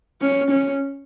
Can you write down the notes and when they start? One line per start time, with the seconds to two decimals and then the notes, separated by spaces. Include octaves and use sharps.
0.21 C#4
0.51 C#4